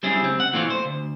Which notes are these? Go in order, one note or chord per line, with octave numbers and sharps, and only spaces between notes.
G3 C4 C#4 E4 G#4
C#2 C4
F#5
A#2 E3 A3 C4 F4
C5
D2